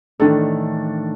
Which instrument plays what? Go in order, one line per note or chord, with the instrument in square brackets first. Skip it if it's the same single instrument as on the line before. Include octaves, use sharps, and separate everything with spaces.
[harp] A2 D#3 E3 [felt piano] D4 A4